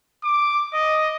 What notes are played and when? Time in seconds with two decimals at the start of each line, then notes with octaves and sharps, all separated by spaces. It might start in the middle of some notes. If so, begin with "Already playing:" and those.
0.24 D6
0.74 D#5